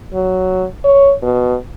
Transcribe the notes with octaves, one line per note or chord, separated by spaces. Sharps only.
F#3
C#5
B2